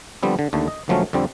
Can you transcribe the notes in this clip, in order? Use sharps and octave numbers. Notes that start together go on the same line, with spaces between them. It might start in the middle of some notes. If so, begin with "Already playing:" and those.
D3 F3 G3 B3 C4
D3
D#2 D3 A3
D#5
D2 A#2 F3 F#3 A3 C#4
F2 D3 G3 C4